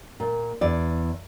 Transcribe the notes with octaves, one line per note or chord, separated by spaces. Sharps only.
A#2
E2 D5